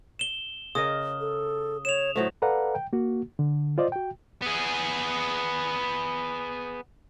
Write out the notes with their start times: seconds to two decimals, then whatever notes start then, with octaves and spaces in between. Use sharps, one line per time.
0.19 E7 G7
0.75 C#3 A#4 D#5 D#6
1.20 A4
1.85 C#5 E7 F7
2.16 A2 F#3 A3 C5
2.42 A4 B4 D5 F5 F#5 A#5
2.75 G5
2.93 A#3 F#4
3.39 D3
3.78 F4 C5 D5 D#5
3.92 F#4 G5
4.42 B3 G#4